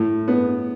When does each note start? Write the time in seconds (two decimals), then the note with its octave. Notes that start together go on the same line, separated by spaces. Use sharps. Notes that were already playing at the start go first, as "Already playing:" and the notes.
Already playing: A2
0.28 B3